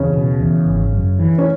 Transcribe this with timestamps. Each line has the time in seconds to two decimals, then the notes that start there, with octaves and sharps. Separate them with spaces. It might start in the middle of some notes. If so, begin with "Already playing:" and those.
Already playing: E2 C#3 C#4
0.13 B2
0.40 E2
0.66 G#1
0.93 F#2
1.19 E3
1.38 C#4